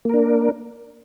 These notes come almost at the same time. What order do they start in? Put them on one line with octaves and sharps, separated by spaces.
A#3 A#4 D4